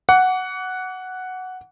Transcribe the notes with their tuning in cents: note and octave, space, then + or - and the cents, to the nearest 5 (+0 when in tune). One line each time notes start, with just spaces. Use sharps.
F#5 +0 D6 -40